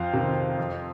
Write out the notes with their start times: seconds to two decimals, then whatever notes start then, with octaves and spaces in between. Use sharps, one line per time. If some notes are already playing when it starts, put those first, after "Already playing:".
Already playing: F2 C5 F5
0.13 C3 D#3
0.58 F2